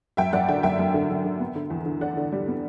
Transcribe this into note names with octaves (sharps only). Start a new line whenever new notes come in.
F#2 E5 G5
F#2 D5 F#5
D3 E5 G5
F#2 E5 G5
F#2
D3
D3
D3
B3
D3
E2
D3
D3 D5 F#5
D3
G3
B3